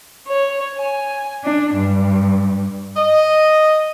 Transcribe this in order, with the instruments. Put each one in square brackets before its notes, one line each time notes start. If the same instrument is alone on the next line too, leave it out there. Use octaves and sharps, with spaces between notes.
[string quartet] C#5
G#5
D4
G2
[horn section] D#5